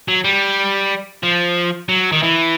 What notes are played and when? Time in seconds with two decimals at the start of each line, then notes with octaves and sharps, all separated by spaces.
0.08 F#3
0.24 G3
1.23 F3
1.89 F#3
2.12 D#3
2.23 E3